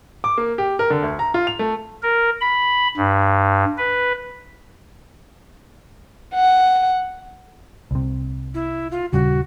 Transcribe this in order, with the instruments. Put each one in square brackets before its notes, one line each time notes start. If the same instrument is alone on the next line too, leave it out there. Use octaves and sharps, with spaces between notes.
[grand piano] D6
A#3
G4
A#4
D3
D2
A#5
F4
F7
A3
[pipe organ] A#4
B5
G2
B4
[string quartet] F#5
[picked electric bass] C2 C3
[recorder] E4
F4
[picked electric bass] D#1 C#3 G3 [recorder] F#4